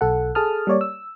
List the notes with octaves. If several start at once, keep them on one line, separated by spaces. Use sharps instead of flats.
B1 A4 F#5
G#4 A4 A5 D#6 F6
G3 A#3 C#5 D5
E6